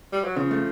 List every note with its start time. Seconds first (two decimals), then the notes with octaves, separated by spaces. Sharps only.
0.12 G3
0.24 F#3
0.37 C#3 F3
0.51 A3